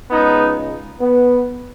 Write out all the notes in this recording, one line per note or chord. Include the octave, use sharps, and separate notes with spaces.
C#2 C#3 G#3 B3 D#4
B3